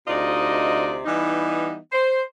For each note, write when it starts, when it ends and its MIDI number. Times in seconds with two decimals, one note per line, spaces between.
0.08 1.01 38
0.08 1.01 48
0.08 1.01 63
0.08 1.01 65
0.08 1.01 74
0.08 1.01 75
1.06 1.77 52
1.06 1.77 55
1.06 1.77 59
1.06 1.77 63
1.93 2.23 72